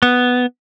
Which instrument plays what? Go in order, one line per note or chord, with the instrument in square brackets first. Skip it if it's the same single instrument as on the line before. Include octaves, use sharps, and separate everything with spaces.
[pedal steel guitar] B3